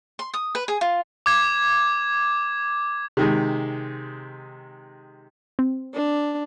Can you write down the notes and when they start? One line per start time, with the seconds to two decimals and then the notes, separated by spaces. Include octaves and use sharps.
0.19 C6
0.34 D#6
0.55 B4
0.68 G#4
0.81 F4
1.26 D6 G#6 E7
3.17 C3 D#3 G#3
5.59 C4
5.94 D4